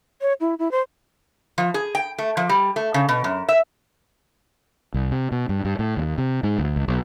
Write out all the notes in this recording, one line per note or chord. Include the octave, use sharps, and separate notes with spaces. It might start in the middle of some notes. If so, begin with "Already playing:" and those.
C#5
E4
E4
C5
F3
G#4
G5
A3
F3
G3
A3
C#3
B2
F#2
E5
C2
C3
B2
G2
G2
A2
D#2
C3
G#2
D2
C#2
B1